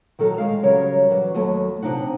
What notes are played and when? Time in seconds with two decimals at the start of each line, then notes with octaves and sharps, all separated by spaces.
0.19 D#3 F#3 A4 A#4
0.38 D#3 G#3 F5
0.63 C#3 F#3 G3 A#4 C#5
1.10 E3 F#3
1.35 D#2 F#3 A3
1.82 C3 D#3 D4 D#4 F#5